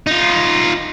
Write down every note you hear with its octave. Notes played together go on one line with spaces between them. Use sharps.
D#4 F4